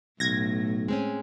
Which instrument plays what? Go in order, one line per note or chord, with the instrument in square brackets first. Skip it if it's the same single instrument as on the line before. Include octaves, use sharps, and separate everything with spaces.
[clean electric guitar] B1 [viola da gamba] A2 [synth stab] G#6 A#6
[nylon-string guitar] G#3 C4 C#4